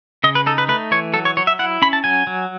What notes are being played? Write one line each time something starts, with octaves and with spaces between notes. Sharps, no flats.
C#3 D#5
B4
D#4 A4
B4
A3 B4
E3 C#5
F#3 A4
C#5
F#3 C#5
E5
E4 F#5
C#4 B5
A5
F#3 G#5
F#3